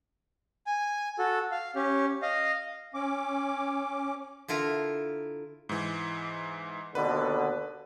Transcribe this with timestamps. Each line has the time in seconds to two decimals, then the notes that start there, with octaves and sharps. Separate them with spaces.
0.67 G#5
1.18 F#4 A4
1.52 F5
1.75 C#4 G4
2.22 D#5 F5
2.94 C#4 D6
4.48 D3 E4 F4 A#4
5.69 G#2 E3
6.95 D#2 B2 D3 B4